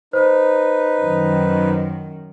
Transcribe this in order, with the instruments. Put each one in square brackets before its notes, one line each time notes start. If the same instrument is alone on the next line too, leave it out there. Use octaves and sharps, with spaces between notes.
[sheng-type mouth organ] D#4 B4 [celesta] C5
[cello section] F#2 D#3